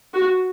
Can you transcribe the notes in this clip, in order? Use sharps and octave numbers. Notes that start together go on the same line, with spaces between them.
F#4